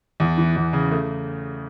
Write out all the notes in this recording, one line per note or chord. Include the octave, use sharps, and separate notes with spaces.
E2
E3
E2
C#3
A3